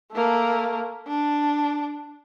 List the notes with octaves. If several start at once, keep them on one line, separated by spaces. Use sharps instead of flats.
A3 A#3
D4